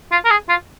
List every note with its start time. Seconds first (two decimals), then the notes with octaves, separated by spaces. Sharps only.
0.11 F4
0.25 A#4
0.30 G#4
0.49 F4